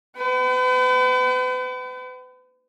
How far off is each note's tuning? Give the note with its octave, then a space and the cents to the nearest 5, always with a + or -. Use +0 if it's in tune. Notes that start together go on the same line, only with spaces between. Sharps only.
B4 +40 G5 -45